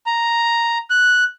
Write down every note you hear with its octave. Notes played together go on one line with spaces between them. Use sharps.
A#5
F#6